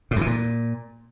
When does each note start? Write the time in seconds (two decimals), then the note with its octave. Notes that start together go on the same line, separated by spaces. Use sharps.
0.11 A2
0.16 E2
0.21 E3
0.26 A#2